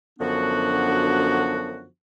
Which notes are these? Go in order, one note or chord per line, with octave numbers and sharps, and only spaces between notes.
F#2 D3 F3 B3 D4 F#4